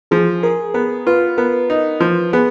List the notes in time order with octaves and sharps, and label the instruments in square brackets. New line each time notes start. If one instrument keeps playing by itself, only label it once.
[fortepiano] F3 [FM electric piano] G#4
[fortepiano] G#4 [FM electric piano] A#4
[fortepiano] B3 [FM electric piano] A#4
[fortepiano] F4 [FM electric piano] B4
[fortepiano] B3 [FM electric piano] A#4
[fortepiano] D#4
F3
[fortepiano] B3 [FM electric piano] G#4